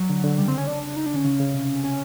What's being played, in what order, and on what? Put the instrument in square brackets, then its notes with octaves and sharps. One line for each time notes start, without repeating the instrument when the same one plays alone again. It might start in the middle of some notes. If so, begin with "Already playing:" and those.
Already playing: [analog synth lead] F#3
[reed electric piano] D3
D3
[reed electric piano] C#3 [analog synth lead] G3
[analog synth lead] C4
C#4
D4
D#4
D4
[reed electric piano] D3 [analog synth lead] C#4
[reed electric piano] C#3
C#3
C3
[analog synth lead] C#4